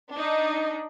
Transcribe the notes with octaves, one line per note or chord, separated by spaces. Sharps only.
D4 D#4